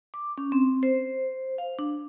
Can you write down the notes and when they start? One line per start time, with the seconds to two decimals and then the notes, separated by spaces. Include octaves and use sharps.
0.14 D6
0.38 C#4
0.52 C4
0.83 C5
1.58 F5
1.79 D4